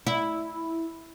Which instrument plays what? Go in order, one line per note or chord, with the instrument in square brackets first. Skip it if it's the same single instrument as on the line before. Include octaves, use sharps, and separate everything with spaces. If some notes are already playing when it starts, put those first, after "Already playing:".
[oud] E4